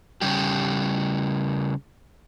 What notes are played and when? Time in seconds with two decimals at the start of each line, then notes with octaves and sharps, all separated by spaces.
0.21 C#3 G3 G4